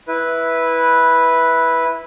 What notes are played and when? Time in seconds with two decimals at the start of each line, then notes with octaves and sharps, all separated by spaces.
0.08 E4 B4